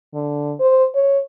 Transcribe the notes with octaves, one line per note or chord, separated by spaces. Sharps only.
D3
C5
C#5